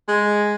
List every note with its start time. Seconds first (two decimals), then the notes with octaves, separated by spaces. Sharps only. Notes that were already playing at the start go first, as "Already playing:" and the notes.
0.08 G#3